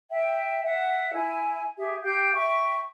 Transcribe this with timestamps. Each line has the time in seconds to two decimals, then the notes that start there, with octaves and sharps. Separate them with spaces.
0.10 E5 G5
0.64 E5 F#5
1.13 E4 G#5
1.77 G4 G#4 E5
2.03 G4 F5 G5 G6
2.34 E5 G5 C#6